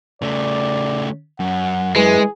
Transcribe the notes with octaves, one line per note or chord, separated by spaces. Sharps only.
C#3 A3 D5
F#2 F#5
E3 G#3 G#4